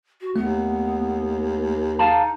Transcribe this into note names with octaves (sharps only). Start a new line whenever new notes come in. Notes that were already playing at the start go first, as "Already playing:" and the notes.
F#4
D#2 A3 B3
D#4 G#4 F5 A5